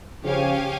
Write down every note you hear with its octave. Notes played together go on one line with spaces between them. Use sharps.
C#3 F3 G4 C#5 F5 G#5